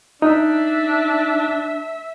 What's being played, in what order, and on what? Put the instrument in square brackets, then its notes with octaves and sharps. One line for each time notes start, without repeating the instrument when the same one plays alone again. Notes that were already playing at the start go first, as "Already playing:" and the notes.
[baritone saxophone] D4 [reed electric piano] D#4 [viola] E5